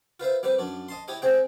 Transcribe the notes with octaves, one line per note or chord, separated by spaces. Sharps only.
F4 B4 C5 E5
G3 C4 G4 B4
F#2 D4
D#5 A5 C6
E4 G4 C#5 D#5
C3 C4 G#4 G5